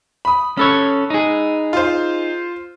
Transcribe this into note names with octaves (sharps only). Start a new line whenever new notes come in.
B5 D#6
C#4 A4 C#5 B5 E6 F#6
D#4 G#4
F4 C5